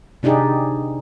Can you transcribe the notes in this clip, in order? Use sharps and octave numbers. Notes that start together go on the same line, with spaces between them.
C3 D4 D#4 G4 G#4